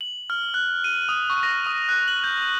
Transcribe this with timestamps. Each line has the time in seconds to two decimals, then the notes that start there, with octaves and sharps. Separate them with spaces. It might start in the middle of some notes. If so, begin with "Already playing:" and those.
0.01 F#7
0.30 F6
0.54 F#6
0.84 D#7
1.09 D#6
1.30 C#6
1.43 A#6
1.67 D#6
1.89 F#6
2.08 F#7
2.24 G6